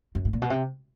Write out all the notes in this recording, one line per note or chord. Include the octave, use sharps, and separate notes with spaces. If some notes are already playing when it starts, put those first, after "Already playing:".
F#2
A2
A#2
B2
C3